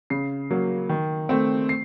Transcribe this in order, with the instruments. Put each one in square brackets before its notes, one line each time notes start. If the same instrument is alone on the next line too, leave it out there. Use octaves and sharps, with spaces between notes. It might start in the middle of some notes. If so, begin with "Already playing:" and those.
[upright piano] C#3 C7
F#3 A#3
D#3
A3 C4
C7